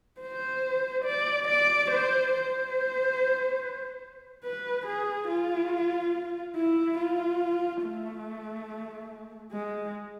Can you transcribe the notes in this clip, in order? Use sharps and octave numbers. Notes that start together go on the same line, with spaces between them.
C5
D5
D5
C5
C5
B4
G#4
F4
E4
F4
A3
G#3